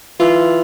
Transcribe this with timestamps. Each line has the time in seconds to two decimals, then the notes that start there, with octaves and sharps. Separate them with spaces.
0.20 E3 F4